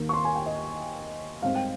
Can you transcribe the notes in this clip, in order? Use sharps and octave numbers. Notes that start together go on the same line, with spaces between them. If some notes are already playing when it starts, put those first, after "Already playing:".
Already playing: D#2 D#3 A#3
C#6
C6
G#5
G5
D#5
G#2 G3 C4 F5
G5